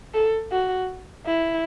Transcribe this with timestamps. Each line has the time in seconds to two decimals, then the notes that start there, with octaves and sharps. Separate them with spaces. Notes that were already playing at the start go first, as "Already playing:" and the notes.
0.14 A4
0.52 F#4
1.25 E4